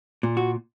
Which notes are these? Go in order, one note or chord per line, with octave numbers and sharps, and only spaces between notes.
A#2
F#4